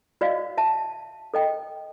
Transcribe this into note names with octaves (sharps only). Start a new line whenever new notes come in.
F#4 D5 D#5 F5
E5 A5
A4 D#5 G5